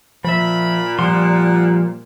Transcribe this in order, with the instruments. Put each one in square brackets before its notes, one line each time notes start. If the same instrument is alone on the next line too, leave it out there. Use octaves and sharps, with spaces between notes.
[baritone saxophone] A#2 [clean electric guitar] F3 E5 [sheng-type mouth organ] B5
[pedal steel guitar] F3 G3 [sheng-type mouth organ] F#5 [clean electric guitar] C6